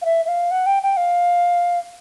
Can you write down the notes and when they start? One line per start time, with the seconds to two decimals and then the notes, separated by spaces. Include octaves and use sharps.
0.02 F5
0.05 E5
0.25 E5
0.28 F5
0.51 F#5
0.66 G5
0.83 G5
0.97 F5